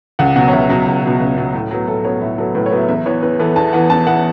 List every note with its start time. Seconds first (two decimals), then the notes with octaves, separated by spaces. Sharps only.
0.19 C#2 F#5
0.36 B2 F#3 F#5
0.48 C#5
0.53 C#2 E5
0.69 B2 F#3
0.87 C#2
1.03 B2 F#3
1.20 C#2
1.38 B2 F#3
1.54 A2
1.71 F#3 B3
1.88 A2 A4
2.05 F#3 B3 C#5
2.21 A2 E5
2.38 F#3 B3 A4
2.55 A2 B4
2.66 C#5
2.72 F#3 B3
2.78 E5
2.88 E2 E5
3.06 E3 B3 C#5
3.22 E2 B4
3.39 E3 B3 A4
3.56 E2 A5
3.73 E3 B3 F#5
3.90 E2 A5
4.07 E3 B3 F#5